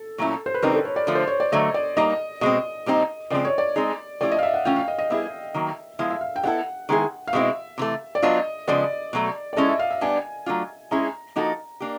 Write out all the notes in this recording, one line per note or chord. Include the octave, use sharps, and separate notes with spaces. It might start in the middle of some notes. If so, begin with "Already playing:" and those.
Already playing: A4
A#2 F#3 A3 C#4 E4
C5
B4
C#3 E3 G3 C4 D#4 A#4
A4
C#5
D5
D3 F3 A3
C5
C#5
D5
D3 F#3 A3 D#5
D5
G3 A#3 D#4 D#5
B2 G#3 C4 D#5
A#2 G3 C4 D#4
C#3 F3 G#3 C4 D5
C#5
D5
G#3 C4 D#4 G#4
F3 A3 C#4 E4 G4 D5
D#5
F5
E5
F#5
E3 A3 C#4 F4 G5
F5
D#5
D#5
G3 B3 E4 G#4 E5
D#3 F#3 A#3
F3 G#3 B3 E4 F5
E5
F5
G5
G3 B3 E4 A4 F#5
D#3 G#3 B3 E4 G#4
F5
B2 G#3 C4 E4 E5
C3 E3 A3
D5
F#3 B3 D4 F4 D#5
C#3 F3 G#3 B3 D5
B2 F#3 A3
D5
G#3 C#4 E4 A4 D#5
E5
F5
E5
G3 B3 D4 G#5
F#3 A3 D4 F4
G#3 C#4 E4 G#4 A#5
F3 A#3 D#4 F#4 A4
A#3 D4 G4